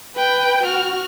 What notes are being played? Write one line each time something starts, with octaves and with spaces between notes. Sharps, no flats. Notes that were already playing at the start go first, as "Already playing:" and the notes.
B4 G5
F#4 F6